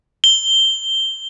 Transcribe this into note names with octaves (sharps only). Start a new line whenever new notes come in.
G7